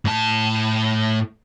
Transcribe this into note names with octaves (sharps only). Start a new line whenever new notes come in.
A2 A5